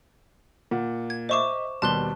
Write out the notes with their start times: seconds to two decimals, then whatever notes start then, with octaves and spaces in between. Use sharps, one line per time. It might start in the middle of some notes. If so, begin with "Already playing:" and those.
0.71 A#2 F#5
1.10 G#6
1.29 C5 D#5 E5 C#6 D6 E7
1.82 D#2 B2 G3 A5 C6 F#6 G7